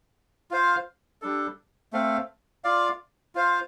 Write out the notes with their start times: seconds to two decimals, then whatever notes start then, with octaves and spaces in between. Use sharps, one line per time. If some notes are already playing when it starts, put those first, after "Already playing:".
0.51 F4 C5 F5
1.22 G3 D4 A4
1.93 A3 C4 A4 F5
2.64 F4 D5 F5
3.35 F4 C5 F5